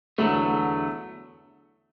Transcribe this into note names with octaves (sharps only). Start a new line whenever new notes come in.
E2 D3 F#3 A3 B3